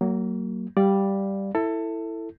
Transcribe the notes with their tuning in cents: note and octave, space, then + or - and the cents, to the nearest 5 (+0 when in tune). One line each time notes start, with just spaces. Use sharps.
F#3 +25 A#3 -15
G3 +0 D5 +0 F5 +0
E4 +0 A4 +20